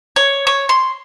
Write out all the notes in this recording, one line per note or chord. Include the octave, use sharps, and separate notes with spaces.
C#5
C#5
C6